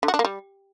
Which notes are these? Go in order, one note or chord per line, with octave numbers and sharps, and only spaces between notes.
D3
F#4
D4
A#3
G3